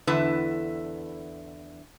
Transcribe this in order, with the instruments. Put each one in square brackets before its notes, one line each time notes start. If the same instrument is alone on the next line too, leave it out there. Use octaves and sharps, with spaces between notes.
[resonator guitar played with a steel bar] E2 D3 E4 A4 B4